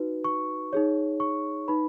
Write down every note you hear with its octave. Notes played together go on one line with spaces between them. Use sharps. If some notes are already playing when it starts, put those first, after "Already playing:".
Already playing: D#4 F#4 B4
C#6
D#4 G#4 C#5
C#6
D#4 B4 B5